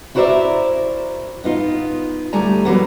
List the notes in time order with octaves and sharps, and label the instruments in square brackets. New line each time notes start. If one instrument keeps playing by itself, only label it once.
[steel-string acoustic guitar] E4 F#4 A#4 C5 D5 E5
B3 D#4 F4
D2 G3 A3 G#5 A#5
E3 F#3 A#3 B3